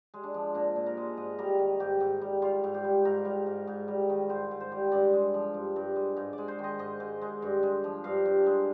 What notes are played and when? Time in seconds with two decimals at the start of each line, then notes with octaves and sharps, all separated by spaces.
0.14 G#3
0.24 D4
0.34 F3
0.54 A#2 D4
0.76 A#2
0.86 A#4
0.97 G#3
1.17 G#2 D#5
1.38 G3 A#4
1.59 D#3
1.80 G#2 G4
2.00 G#2
2.21 G3
2.42 G3 F4
2.64 G#2
2.74 G4
2.84 G3
3.05 G#2 A#4
3.25 G3
3.46 G#2
3.67 G#2
3.88 G3
4.09 D#3
4.29 G#2 C5
4.51 G#2
4.60 C5
4.72 G3
4.92 G2 D5
5.13 G#3
5.34 F3
5.54 G2
5.76 G2
5.96 G#3
6.17 G#2
6.33 D5
6.38 G#3
6.48 C5
6.59 D#3
6.64 D#5
6.79 G#2 D#5
7.00 G#2
7.22 G#3
7.42 G2
7.63 G#3
7.84 F3
8.04 G2 F5
8.25 G2
8.46 G#3